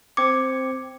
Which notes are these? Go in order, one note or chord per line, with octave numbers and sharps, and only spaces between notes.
C4 D6 G#6 C#7